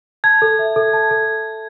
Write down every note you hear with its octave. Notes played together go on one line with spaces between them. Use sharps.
A5 G#6
A4
E5
A4
A5
A4